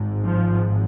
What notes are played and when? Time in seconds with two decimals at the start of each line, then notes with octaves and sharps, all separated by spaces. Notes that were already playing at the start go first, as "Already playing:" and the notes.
Already playing: G#1 G#2
0.25 F3